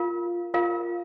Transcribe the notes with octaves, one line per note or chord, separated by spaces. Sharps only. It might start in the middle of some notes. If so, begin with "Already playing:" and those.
Already playing: F4 A#4 F5
F4 A#4 F5